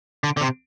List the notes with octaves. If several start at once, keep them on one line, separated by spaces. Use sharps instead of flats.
D3
D3
C3